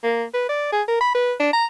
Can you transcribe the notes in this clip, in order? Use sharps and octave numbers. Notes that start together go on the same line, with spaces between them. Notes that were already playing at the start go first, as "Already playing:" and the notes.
A#3
B4
D5
G#4
A#4
B5
B4
D4
A#5